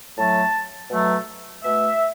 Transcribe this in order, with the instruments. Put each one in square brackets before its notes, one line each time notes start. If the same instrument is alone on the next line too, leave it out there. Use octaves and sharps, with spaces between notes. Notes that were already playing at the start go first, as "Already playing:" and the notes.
[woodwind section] A2 F#3 A3 A5
B2 F#3 A3
B2 A3 E5